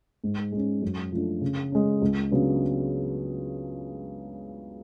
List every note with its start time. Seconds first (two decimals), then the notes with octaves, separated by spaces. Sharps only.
0.24 G#2
0.52 G#3 C#4
0.82 F#2
1.12 F3 A3 D4
1.41 C#3
1.72 G#3 C#4
2.02 C#2
2.31 C#3 F#3 B3 D4